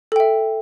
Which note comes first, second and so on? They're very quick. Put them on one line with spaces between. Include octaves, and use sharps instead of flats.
A4 G5 E5